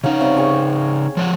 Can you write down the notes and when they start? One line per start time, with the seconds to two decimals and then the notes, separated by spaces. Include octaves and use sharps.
0.04 C#3 C#4 D#4 F5 F#5
0.21 C3 G3
0.37 G#4 G5 C#6
1.17 F3 C#5 F#5